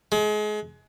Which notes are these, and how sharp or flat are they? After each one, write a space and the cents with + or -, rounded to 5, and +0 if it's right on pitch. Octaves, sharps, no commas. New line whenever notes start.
G#3 +30